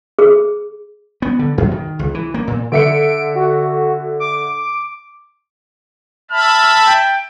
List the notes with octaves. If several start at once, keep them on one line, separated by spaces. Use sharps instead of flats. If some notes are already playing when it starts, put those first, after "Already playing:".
G#4
B3
D3
F#2
D#3
C#2
E3
A#3
A#2
D3 E5 C#7 D7
F#4
D6
E5 A5 B5 F6
G5